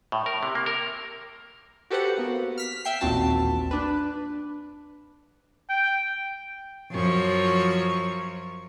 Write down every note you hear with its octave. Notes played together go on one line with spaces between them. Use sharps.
A2
A#4
C3
A#3
A#4
F#4 G4 A4 B4 C5 F#5
A#3 B3 F#4
F6 B6
E5 G5 C7
A1 D#2 A#2 C4 F#4 A5
D4 B4
G5
F#2 F3 C#5